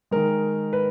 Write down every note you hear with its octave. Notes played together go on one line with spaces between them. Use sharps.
D#3 G#3 A#4
B4